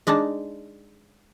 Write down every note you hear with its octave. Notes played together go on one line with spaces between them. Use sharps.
G#3 D4 D#4 A5